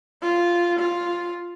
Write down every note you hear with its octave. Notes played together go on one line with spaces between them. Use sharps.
F4
F4